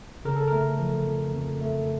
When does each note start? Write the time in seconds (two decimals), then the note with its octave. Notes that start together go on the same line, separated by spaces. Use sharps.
0.25 C#3 A#4
0.36 A4
0.48 A3 A#4
0.79 F3
1.06 F2
1.33 F2
1.61 A3